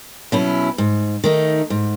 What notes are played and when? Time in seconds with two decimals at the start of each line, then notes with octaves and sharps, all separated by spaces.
0.32 B2 F#3 C#4 E4
0.78 G#2
1.24 D#3 A3 D#4
1.70 G#2